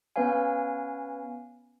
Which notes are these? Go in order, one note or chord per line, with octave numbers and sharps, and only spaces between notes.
B3 C#4 B4 C#5 F5 G#5